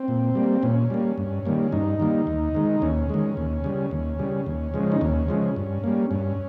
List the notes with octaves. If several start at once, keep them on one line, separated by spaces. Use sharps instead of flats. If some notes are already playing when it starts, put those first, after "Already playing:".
Already playing: C4
A#2
G3 A#3
A#2 C#4
G3 A#3
G2
D#3 G3 A#3
G2 D#4
D#3 G3 A#3
D#2
D#3 G#3
D#2 C#4
D#3 G#3
D#2
C#3 G3
D#2
C#3 G3
D#2
C#3 F3 G#3
D#4
D#2 C#4
C#3 F3 G#3
G2
G3 A#3
G2 C#4